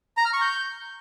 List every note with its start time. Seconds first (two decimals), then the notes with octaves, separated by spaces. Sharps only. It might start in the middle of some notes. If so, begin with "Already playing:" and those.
0.17 A#5
0.25 F6
0.33 C#6
0.41 G6